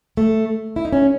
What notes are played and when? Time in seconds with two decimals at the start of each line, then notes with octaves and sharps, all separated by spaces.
0.17 A3
0.76 E4
0.85 D#4
0.93 C#4